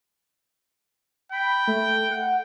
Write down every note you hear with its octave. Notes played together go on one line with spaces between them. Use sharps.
G5 B5
A3
F#5